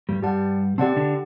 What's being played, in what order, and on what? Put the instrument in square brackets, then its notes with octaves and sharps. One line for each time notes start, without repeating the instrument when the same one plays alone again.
[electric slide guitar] G2 G3
[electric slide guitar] G2 G3 [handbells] G4 D5 F#5 A5
[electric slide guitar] C3 C4 [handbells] G4 D5 F#5 A5
[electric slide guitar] D3 D4